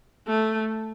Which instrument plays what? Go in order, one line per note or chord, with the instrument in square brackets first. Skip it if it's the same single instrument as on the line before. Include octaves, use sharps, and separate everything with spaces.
[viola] A3